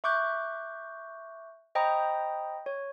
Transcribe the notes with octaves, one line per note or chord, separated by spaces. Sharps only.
E5 C#6 D6 F#6 G6
C5 D#5 G5 A#5 B5 D#6
C#5